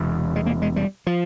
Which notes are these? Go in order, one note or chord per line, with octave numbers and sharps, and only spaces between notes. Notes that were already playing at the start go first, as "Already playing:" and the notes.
Already playing: E1 E2 C3
G#3
A#3
G#3
G3
F3